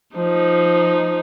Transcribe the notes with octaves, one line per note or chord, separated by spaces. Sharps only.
F3 D#4